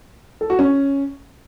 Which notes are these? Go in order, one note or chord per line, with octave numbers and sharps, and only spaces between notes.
A4
F#4
C#4